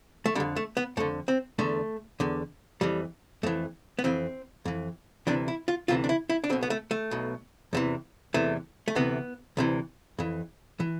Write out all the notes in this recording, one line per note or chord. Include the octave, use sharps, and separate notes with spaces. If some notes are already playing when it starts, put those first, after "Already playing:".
A3
F2 D3 G3
A3
B3
F2 D3 A3
C4
E2 D3 A3
E2 D3
F2 E3 G3
F2 E3 A3
B3
F2 E3 C4
F2 E3
D2 C3 E3 D4
E4
F4
D2 C3 E3 F4
D4
E4
E4
D4
B1 B2 C4
B3
A3
A3
B1 B2
E2 C3 E3
E2 C3 E3 A3
A3
D2 C3 E3 B3
D2 C3 E3
F2 E3
E3